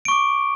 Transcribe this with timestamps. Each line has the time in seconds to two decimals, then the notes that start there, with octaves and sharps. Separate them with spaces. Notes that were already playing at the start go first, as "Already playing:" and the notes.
0.05 D7
0.08 C#6
0.11 D6